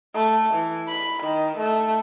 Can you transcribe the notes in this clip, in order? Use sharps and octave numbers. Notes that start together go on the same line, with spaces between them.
A3
E3
B5
D#3
A3